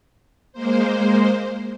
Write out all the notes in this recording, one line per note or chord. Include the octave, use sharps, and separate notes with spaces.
G#3 A#3 C5